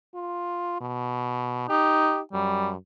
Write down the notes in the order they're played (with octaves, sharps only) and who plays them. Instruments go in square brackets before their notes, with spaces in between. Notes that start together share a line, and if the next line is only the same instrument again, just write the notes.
[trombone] F4
B2
[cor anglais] D#4 [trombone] G4
[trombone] F#2 [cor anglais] G3